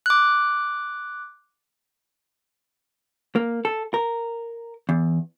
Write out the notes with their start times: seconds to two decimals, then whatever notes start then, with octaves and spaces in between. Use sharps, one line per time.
0.06 D6 F#6
3.36 A#3
3.65 A4
3.94 A#4
4.89 E2